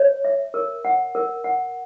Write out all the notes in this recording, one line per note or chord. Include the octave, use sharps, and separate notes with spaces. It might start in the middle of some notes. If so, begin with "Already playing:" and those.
Already playing: C#5
E5
A#4
F#5
A#4
F#5